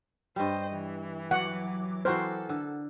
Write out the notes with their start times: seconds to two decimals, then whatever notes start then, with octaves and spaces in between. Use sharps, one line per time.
0.36 G2 G3 C5 D#5
0.71 E3
1.31 F#3 F#5 D6
2.05 E3 F#4 A4 A#4 C5
2.49 D3